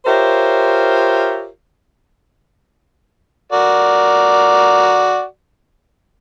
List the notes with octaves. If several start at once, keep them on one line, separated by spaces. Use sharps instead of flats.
F4 G4 A#4 C5 C#5 E5
F#4 A#4 D5